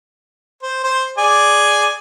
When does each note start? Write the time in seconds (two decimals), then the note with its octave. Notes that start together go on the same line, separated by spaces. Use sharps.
0.63 C5
0.84 C5 C6
1.18 G#4 D5 G#5